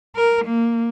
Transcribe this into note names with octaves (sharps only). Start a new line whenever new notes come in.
A#4
A#3